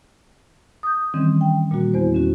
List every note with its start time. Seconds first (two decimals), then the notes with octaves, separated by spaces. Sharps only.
0.83 D#6 G6
1.14 D#3 E3 G3 C4 C#4
1.41 G5
1.71 A#2 G3 A#3 F#4
1.94 E2 B3 C5
2.14 C#4 F#4